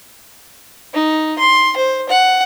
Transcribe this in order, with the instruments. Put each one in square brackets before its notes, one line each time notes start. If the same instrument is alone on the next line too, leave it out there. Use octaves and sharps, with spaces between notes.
[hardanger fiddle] D#4
C6
C5
F#5